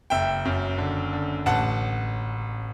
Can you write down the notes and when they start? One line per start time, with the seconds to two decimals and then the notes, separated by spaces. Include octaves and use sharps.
0.10 F#1 E5 G5
0.45 F#2
0.78 D3
1.13 D3
1.46 A1 F#5 A5